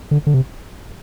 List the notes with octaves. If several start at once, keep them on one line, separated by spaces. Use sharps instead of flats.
D3
D3
C3